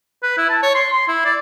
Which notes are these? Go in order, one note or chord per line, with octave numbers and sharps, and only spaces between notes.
B4
E4
A5
C#5
C6
C6
E4
D5